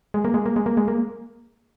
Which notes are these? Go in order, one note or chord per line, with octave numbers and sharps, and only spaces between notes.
G#3
A#3
G#3
A#3
G#3
A#3
G#3
A#3